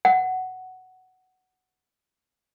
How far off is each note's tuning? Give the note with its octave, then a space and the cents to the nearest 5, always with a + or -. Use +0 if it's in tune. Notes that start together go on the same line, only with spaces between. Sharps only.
F#5 +5